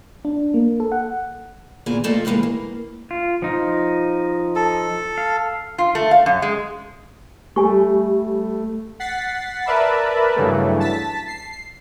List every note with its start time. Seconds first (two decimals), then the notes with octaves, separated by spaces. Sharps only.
0.25 D4
0.54 A#3
0.80 A4
0.92 F#5
1.86 D2 A#2 E3 B3 G#4 G#5
2.04 A#2 F3 A3 A#3 A4 D#5
2.25 A2 C3 E3 G#3 A#3
2.43 A#3
3.11 F4
3.42 F3 D#4
4.56 A4
5.18 F5
5.78 F4
5.95 A3
6.11 F5
6.26 F#2
6.42 G#3
7.56 G3 A3 G4 G#5 C#6
9.00 F#5 A6 B6 C7
9.66 A#4 B4 D5 E5 A5 B5
10.36 G2 C#3 E3 F#3 A3
10.80 A5 A6 B6
11.27 C7